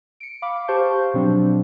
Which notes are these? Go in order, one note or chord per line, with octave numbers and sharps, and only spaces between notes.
C#7 D7
F5 B5 D6
G4 C5 F5 A5 C#6 G6
B2 F3 F#3 C4 D4